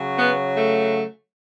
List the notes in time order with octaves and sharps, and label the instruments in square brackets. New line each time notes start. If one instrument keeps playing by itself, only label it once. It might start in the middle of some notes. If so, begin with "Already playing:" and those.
Already playing: [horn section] C#3 F#3
B3
A3